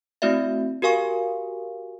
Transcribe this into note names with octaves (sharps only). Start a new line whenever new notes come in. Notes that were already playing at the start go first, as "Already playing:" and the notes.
A3 C4 E4 F#4 D5 E5
F#4 G4 A#4 F5 G#5 C#6